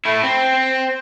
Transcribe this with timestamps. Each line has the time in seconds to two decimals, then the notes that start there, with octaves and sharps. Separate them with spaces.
0.05 A3 E4
0.23 C4